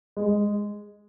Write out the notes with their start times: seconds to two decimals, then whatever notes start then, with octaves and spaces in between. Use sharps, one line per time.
0.17 G#3